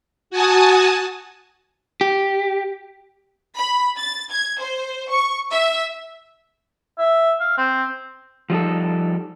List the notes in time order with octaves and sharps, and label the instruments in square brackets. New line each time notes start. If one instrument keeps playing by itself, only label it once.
[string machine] F#4 G#5 A5 D#6
[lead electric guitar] G4
[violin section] B5
A6
G#6
C5
C#6
E5
[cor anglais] E5
F5
C4
[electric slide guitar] F3 G3 D#4 A4